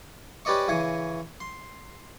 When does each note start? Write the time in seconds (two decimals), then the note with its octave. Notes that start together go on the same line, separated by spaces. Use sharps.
0.45 C#4 G4 B4 D5 D#5 C#6
0.68 C#3 E3 G#5 C#6
1.40 C6